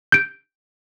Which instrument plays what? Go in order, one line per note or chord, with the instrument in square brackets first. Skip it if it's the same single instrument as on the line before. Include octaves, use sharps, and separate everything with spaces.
[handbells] G6 D7